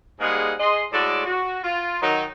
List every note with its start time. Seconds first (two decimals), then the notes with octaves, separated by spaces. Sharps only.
0.20 G#2 G3 G#3 A#3 G#4 F#5
0.60 G#4 D#5 C6
0.93 A2 G#3 F#4 A4 D5
1.26 F#4
1.64 F4
2.01 D#3 F#3 D#4